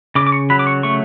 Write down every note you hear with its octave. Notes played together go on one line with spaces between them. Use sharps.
C#3 D6
D6
C#6
F#3 B5
D6
C#6
A3 C#6